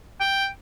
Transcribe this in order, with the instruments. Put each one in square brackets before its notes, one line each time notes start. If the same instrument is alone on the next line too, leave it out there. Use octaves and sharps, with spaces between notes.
[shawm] G5